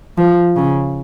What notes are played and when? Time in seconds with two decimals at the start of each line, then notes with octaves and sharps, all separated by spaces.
0.18 F3
0.56 C#3